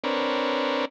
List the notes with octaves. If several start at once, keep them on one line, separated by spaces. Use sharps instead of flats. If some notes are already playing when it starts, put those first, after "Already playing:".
C4 D4 A#4 B4 C#5